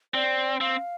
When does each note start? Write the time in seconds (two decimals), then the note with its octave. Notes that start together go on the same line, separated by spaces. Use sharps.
0.14 C4 D5
0.61 C4 F5